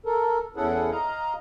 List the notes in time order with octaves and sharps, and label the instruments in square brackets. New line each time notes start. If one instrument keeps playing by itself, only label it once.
[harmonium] A4 A#4
E2 C#4 E4 G#4 A4 F#5
D#5 F5 A#5